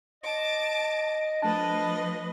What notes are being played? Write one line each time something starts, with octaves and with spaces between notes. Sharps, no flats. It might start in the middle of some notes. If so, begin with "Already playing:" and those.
D#5 A5 D6
F3 A3 D4 B4 D#5 A5